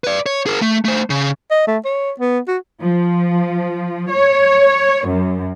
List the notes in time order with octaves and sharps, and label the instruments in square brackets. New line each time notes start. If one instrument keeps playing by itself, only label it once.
[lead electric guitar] B4 D5
C#5
G#4 A#4
A3
A3 C5
C#3
[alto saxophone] D#5
A3
C#5
B3
F#4
[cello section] F3
C#5
F#2